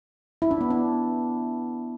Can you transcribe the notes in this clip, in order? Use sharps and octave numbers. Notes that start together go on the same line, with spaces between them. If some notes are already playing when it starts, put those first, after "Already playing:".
E4
D4
B3
D4